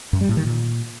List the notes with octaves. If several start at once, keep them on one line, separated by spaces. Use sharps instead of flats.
F#2
G3
A2
D#3
A#2